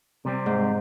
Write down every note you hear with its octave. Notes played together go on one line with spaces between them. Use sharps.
C3 G3 C4
G#2